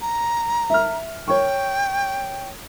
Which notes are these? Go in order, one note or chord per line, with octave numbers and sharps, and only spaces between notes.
A#5
E5 F6
C#5 G5 C#6